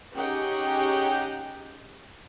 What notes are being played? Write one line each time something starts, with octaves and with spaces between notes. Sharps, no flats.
C#4 D#4 G4 G#4 F#5 G5